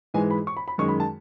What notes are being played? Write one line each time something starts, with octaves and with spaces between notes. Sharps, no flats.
G#2 E3 G#3 G#5
B5
C#6
B5
B5
F#2 D#3 G#3 C#6
B5
A5